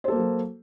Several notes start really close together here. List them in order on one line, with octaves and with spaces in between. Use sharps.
C5 A4 A#3 F#3 F#4